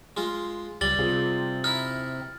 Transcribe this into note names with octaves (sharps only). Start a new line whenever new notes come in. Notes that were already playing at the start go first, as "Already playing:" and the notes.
G#3 F4
C#2 G3 A6 F#7 G7
C3 F4 G#4
D#4 E4 F6